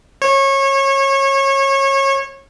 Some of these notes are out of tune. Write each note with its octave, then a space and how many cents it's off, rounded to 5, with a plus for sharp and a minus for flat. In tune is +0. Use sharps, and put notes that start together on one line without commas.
C#5 -25